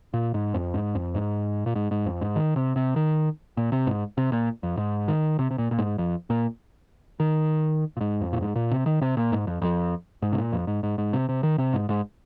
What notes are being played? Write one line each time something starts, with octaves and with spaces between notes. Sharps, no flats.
A#2
G#2
F2
G#2
F2
G#2
A#2
G#2
G#2
F2
G#2
D#3
C3
C3
D#3
A#2
C3
G#2
C3
A#2
F2
G#2
D#3
C3
C3
A#2
A#2
G#2
F2
A#2
D#3
A#2
G#2
F2
A#2
G#2
A#2
C3
D#3
C3
A#2
G#2
F2
F2
G#2
C3
A#2
F2
G#2
G#2
G#2
C3
C3
D#3
C3
G#2
G#2